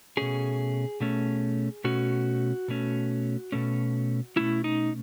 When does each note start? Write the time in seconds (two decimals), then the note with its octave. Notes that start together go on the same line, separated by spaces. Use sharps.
0.17 B2 A3 C#4 G#4
1.00 B2 A3 C#4
1.84 B2 A3 C#4 F#4
2.68 B2 A3 C#4
3.52 B2 A3 C#4
4.36 B2 A3 C#4 E4
4.64 D#4